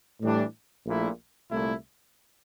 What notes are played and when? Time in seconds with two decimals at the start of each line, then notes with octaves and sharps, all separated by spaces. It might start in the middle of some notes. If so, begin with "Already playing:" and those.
0.21 A2 E3 G3 D4
0.85 A#1 A#2 A3 E4
1.51 C2 A#2 A3 E4